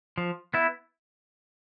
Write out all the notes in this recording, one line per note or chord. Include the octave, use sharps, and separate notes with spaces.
F3
B3 E4